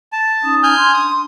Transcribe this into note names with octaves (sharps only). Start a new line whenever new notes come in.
A5
C#4 D#4 D#6
G#5 F6 G6
D4 C6
D#6